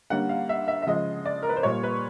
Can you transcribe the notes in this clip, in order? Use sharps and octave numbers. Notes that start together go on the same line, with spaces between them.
D3 G3 A#3 C#4 F#5
F5
E5
E5
E5
C#3 F3 G#3 D#5
D5
A#4
B4
C5
A#2 G3 A#3 C#5
B4